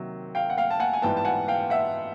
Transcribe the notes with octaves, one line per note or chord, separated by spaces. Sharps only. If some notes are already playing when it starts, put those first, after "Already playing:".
Already playing: C3 D#3 F#3 A#3
F5 G5
F#5
F5 G5
A5
F#5 G#5
G#5
G#2 E3 G3 B3 G5 A5
A5
F#5 G#5
F5 G5
E5 F#5